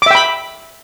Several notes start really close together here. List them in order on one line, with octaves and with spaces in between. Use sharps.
D6 E5 G5 B5